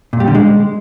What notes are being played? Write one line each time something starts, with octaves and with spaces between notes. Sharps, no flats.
A#2
G3
D3
G#3